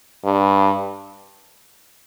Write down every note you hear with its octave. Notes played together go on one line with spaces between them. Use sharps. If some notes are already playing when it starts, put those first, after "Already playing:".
G2